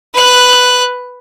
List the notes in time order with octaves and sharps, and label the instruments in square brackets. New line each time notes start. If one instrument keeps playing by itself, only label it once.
[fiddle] B4 F#6